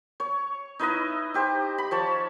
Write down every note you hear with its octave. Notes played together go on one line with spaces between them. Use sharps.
C#5
D#4 E4 B4 D#5
D#4 G4 C5
B5
F3 C#5 A5